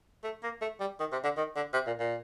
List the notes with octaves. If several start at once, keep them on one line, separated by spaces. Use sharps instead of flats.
A3
A#3
A3
G3
D#3
C3
D3
D#3
D3
C3
A#2
A#2